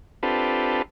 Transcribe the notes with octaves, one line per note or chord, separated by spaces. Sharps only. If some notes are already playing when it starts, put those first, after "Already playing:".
C4 D4 F4 G4 A4 B4